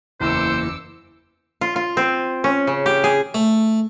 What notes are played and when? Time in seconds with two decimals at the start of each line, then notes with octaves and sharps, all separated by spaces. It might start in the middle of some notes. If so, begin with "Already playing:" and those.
0.20 F#1 E2 A#3 E4 C5 D6 E6 C#7
1.61 F4
1.76 F4
1.97 C4
2.44 C#4
2.67 C#3
2.86 G4
3.04 G#4
3.34 A3